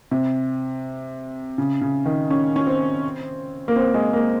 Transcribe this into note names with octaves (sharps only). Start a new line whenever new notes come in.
C3
C#3
C#3
D#3
C#4
C#4
C4
A#3
C4
G#3
A#3